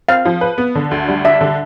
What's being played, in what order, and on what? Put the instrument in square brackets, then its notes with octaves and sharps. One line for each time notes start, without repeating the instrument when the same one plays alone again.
[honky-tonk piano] C4 [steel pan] F5
[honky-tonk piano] F3
B4
B3
D3
D2
G3
[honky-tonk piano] D4 [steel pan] E5
[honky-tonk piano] D3